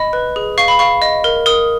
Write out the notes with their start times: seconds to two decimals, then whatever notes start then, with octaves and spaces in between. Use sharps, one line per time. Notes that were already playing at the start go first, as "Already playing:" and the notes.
Already playing: D#5 B5
0.13 B4
0.36 G#4
0.58 F5 C#6
0.68 B5
0.79 F5 C#6
1.02 D#5
1.24 A#4
1.46 A#4 D#6